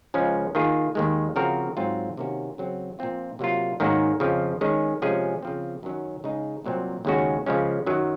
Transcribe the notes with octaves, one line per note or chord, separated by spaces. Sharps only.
C#2 C#3 F3 G#3 C#4
D#3 A#3 F4 G#4
D#2 D#3 G#3
C#3 F3 C4 F#4 A#4
G#2 F#3 C4 F4
C3 D#3 A#3 C#4 F#4
C#3 F#3 C4
A#2 F3 C4 F4
C3 F#3 A#3 F4
G#2 D#3 A#3 C#4 F#4
F2 C#3 F3
D#3 G#3 C#4 G#4
C3 F3 G#3 C#4 G#4
C#3 F3 C4
F#2 D#3 F#3 C#4
C#3 G#3 D#4 G#4
C2 A#2 F#3 C4
D#2 C#3 G#3 C#4 F#4
C#3 F3 G#3 C#4
F#2 D#3 F#3